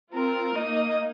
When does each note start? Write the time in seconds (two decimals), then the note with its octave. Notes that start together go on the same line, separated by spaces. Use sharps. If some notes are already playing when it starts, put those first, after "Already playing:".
0.14 C4 F4 A#4
0.55 A#3 D#4 D#5